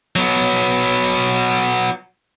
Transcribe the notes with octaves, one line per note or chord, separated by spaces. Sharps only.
F#3 B3